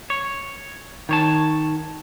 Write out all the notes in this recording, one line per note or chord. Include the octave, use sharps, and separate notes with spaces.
C#5
D#3 C#5 A5